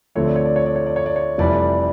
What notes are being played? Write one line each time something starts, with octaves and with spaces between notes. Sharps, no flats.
D2 D3 F3 A3 C4 C#5
D5
C#5
D5
C#5
D5
C#5
D5
C#5
D5
C#5
F1 F2 C3 E3 G3 D5